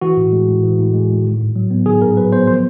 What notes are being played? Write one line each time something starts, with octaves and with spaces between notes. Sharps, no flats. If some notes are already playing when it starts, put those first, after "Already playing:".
E3 F#4
A2
G#3
A2
E3
A2
G#3
A2
D#3
G#2
F#3
B3
D#3 G#4
G#2 A#4
F#3 B4
B3 C5
F3 C5